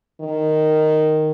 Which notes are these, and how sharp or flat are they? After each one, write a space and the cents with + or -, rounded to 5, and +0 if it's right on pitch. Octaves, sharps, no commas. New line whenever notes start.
D#3 -5